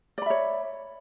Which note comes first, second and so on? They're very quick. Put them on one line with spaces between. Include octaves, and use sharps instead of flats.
D5 B5 E5 C#5